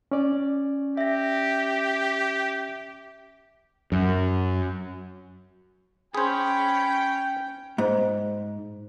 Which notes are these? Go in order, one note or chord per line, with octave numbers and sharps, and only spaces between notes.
C#4 D5
G4 E5 A#6
F#2
C#4 G#4 C5 G5 B5
G#2